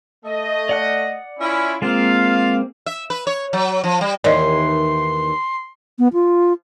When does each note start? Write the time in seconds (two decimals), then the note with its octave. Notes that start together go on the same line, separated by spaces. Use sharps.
0.24 A3 D#5
0.69 D5 F#5 F#6
1.39 C#4 E4 F4
1.82 G#3 A#3 C4 F4 F5
2.86 E5
3.10 B4
3.27 C#5
3.53 F#3
3.84 F3
4.01 G3
4.24 D#2 D#3 E3 D5 D#5 C6
5.99 B3
6.13 F4